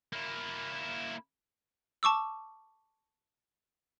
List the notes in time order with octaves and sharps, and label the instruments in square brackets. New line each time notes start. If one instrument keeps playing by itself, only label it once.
[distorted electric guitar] A#3 E4
[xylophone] A5 C#6 D6 E6